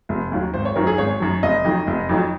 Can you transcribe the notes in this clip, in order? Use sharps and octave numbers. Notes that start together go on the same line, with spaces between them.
F1
D#2 D#3 F#3
G#1 C5
C#5
F#2 D#3 F#3 A#4
G#4
G#1 C#5
F#2 D#3 F#3
F1 D#5
F2 D#3 F#3
F1
F2 D#3 F#3